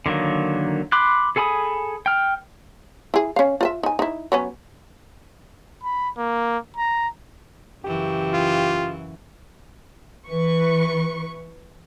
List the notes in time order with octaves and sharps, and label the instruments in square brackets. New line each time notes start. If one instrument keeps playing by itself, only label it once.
[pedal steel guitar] D3 D#3 F#3 A#3
B5 C6 D6 F#6
G#4 A4 G#5 B5 D#6
G5 F6
[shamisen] E4 G#4
C#4 F5
F4 D#5 E5
D#4 G#5
D#4 E4
F#3 B3 C#4
[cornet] B5
A#3
A#5
[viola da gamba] F#2 C#3 E3 [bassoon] G4
[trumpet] F4
[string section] E3 B4 C#6